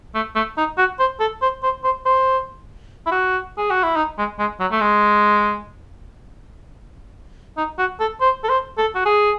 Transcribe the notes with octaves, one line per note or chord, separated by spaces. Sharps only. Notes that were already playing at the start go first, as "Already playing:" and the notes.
A3
A3
D#4
F#4
C5
A4
C5
C5
C5
C5
E4
F#4
G#4
F#4
E4
D#4
G#3
G#3
F#3
A3
G#3
D#4
F#4
A4
C5
A4
C5
A4
F#4
G#4